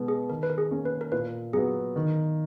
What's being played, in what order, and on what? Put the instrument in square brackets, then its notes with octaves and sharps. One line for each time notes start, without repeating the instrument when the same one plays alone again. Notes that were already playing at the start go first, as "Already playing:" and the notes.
Already playing: [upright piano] B2 G#3 B3
[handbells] G#4
[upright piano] D#3 [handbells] A#4
[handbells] B4
A#4
G#4
[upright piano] A#3 C#4
[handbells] B4
A#4
[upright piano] A#2 [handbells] B4
[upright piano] F#3 B3 [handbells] G#4
[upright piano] D#3